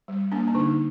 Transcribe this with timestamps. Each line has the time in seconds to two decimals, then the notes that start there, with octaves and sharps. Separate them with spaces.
0.08 G3
0.32 A#3 D4
0.48 D4
0.55 D3 D#4